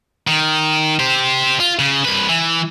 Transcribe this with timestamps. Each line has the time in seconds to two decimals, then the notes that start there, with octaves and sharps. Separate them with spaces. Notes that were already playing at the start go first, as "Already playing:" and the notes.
0.27 D#3
1.00 G4 C5
1.60 F4
1.79 C#3
2.05 C2 B4
2.29 E3